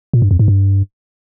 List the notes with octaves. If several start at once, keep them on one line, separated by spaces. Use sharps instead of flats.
A#2
G2
F2
G#2
G2